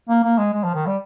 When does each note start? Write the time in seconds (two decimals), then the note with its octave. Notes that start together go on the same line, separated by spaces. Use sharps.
0.09 A#3
0.23 A#3
0.38 G#3
0.53 G#3
0.64 F3
0.75 D#3
0.87 G3